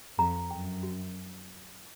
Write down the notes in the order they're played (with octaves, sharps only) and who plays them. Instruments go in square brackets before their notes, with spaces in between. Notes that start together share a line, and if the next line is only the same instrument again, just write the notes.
[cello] F2 [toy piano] A#5
[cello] F#2 [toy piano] G5
[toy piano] F#4